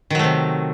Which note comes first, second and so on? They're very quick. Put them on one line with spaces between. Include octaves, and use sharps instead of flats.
D#3 F#3 A3 C3